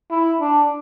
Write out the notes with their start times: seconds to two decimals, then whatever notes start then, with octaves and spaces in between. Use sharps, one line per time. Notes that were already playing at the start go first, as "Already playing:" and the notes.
0.11 E4
0.40 D4